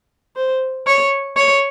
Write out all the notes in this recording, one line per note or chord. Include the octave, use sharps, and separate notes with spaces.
C5
C#5
C#5